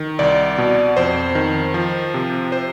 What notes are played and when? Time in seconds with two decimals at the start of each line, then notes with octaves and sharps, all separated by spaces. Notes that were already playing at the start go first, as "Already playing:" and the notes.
Already playing: D#3
0.19 C2 D5
0.58 B2
0.97 F2 C5
1.35 D#3
1.74 F3
2.14 C3
2.52 C5